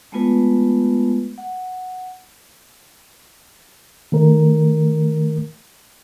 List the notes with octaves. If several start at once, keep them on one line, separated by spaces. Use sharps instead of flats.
G#3 A3 B3 F4 B4
F#5
D#3 A3 A#4